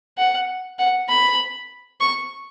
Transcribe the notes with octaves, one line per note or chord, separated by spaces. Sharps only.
F#5
F#5
B5
C#6